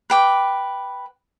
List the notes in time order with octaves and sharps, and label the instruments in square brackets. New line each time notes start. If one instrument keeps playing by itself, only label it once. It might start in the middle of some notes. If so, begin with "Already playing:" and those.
[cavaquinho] B4 G5 D6